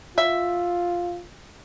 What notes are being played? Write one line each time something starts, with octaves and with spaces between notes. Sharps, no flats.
F4 E5